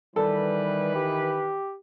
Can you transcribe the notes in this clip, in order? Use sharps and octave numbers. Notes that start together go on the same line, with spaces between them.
D#3 E3 G3 A4 B4
G4